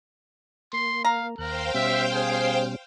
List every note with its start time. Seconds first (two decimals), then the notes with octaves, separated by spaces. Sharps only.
0.73 A#3 C6
1.05 F5 A#5
1.38 D#2 A#4 C5 F5 G5 F#6
1.74 B2 G3 C#4 E5
2.13 G#4